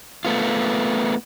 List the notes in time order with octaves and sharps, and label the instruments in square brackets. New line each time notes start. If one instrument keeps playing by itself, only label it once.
[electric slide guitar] A3 B3 F4